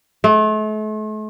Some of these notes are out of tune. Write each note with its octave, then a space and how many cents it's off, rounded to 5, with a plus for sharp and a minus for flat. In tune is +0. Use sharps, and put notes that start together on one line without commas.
A3 -40